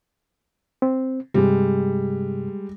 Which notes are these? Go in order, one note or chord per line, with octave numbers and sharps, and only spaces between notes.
C4
G2 C3 G3 G#3